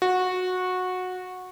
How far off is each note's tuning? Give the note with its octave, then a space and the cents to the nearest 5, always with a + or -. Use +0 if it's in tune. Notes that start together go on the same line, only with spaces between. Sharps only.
F#4 -15